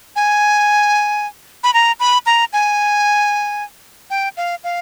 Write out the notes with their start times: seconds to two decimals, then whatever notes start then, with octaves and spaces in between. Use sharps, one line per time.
0.16 G#5
1.64 B5
1.74 A#5
2.00 B5
2.26 A#5
2.53 G#5
4.10 G5
4.37 F5
4.64 F5